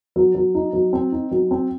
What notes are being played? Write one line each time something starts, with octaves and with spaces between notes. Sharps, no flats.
F#3
F#3
D#4
F#3
C4
D#4
F#3
C4